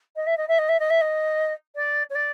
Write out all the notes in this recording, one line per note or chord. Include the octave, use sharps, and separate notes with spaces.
D#5
E5
D#5
E5
D#5
E5
D#5
E5
D#5
D5
C#5
D5